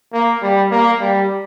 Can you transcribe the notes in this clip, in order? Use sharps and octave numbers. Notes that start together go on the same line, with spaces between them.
A#3
G3
A#3
G3